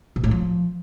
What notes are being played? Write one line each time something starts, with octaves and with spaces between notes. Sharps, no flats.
B2
A2
F3